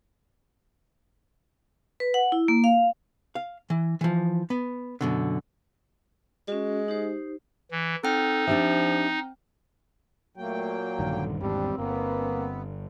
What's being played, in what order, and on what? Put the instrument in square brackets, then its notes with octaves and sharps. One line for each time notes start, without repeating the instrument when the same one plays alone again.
[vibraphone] B4
F#5
E4
A#3
F5
[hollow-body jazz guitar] F5
E3
E3 F3
B3
F#2 B2 D3
[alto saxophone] G#3 [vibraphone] C#4 F#4
[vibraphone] D#4 G4 C5
[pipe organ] E3
[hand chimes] C4 G5 F6 [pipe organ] D#4 [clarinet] A4
[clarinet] F3 [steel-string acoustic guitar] D4 G4 E5
[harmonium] A#2 A#3 G5 [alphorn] F#3 [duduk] A3
[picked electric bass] A#1 G2 D#3 [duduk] D3
[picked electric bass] G#1 E2 G#2 [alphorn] G3 [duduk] C4 [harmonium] D4
[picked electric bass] G1 [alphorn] A#3 [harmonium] B3